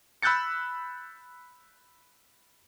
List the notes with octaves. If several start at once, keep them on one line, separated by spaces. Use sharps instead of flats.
B5 E6 F#6 G6 A6 C#7